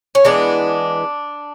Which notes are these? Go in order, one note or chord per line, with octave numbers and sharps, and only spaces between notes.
C#4
E3 G#3 B3 D4